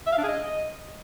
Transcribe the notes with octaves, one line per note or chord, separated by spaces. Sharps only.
E5
F5
D4
G#4
D#5